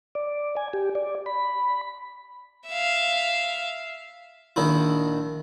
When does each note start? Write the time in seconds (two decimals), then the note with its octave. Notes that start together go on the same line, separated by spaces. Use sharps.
0.15 D5
0.57 G#5
0.73 G4
0.95 D5
1.26 B5
2.68 E5 F5
4.56 A#1 D#3 D#4 E4